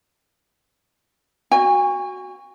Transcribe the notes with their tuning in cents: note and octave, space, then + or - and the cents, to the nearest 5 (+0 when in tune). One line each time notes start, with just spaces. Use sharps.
F#4 +0 G#5 -40